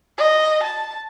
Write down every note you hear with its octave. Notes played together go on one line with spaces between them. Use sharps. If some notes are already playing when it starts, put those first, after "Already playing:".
D#5
A5